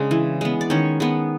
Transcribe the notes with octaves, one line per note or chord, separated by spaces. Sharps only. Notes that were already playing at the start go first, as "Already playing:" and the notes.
Already playing: C#3 G#3 D4
E3
G#3 B3
D5
D#3 C#4 C#5
G#3 B3